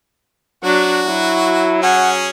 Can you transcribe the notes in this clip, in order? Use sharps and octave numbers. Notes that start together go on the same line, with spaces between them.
F#3 D4 F#4
F#3 E4
C#4 G#4 F#5